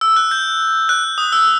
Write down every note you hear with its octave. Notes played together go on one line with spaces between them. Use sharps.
E6
F#6
G6
F#6
D#6
E6